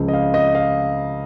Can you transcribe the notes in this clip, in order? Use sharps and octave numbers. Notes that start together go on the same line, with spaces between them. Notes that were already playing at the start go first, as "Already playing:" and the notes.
Already playing: C#2 C#3 F3
D#5
F5
D#5
F5